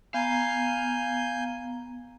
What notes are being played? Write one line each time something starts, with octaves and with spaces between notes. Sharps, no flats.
B3 F5 G#5 A#5 G6